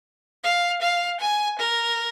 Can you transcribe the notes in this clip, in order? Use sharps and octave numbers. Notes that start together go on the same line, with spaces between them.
F5
F5
G#5
A#4